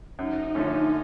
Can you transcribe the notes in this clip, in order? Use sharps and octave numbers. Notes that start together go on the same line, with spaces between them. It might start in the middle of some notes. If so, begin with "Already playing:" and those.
F#2 D#4
D3 F3 A3 C#4